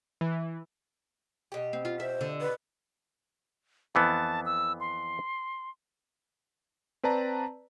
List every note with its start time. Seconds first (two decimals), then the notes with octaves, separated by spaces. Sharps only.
0.21 E3
1.52 B2 G4
1.73 C4
1.85 F4
2.00 C5 E5
2.21 D3
2.41 B4
3.95 F2 E3 B3 A5
4.46 E6
4.80 C6
7.03 C4 B4 D5 A5 A#5